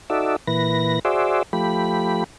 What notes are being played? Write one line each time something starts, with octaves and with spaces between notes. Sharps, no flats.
D#4 F#4 A4 D5 E5
A#2 E3 B4 A#6
F#4 G#4 C5 D5 E5
F3 A3 G4 B5